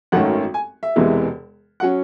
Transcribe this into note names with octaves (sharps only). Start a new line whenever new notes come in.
G#1 F#2 D#3 A3 C#4 F#5
G#5
E5
E1 E2 C3 E3 G#3
F#3 C#4 F#5